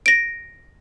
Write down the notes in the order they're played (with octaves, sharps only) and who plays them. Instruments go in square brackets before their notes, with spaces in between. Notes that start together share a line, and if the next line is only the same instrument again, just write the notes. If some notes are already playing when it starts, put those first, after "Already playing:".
[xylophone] A#6 D7